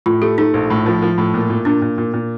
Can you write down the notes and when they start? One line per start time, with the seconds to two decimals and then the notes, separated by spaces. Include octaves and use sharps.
0.06 A2 F4
0.22 A3 G4
0.38 A3 D#4
0.54 A#1
0.70 A2
0.86 F3
1.02 F3
1.18 A2
1.34 A#2
1.50 A#2
1.65 A#2 D4
1.82 A#2
1.98 A#2
2.13 A#2